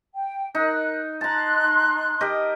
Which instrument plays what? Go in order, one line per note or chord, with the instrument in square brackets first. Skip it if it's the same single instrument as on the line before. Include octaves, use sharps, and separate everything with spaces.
[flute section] G5
[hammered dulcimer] D#4 [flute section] A#4 F#6
[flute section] D#4 C6 F#6 [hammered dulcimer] A5 A#5
[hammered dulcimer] G4 A#4 D#5